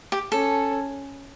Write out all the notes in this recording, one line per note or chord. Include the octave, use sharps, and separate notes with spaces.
G4
C#4 A4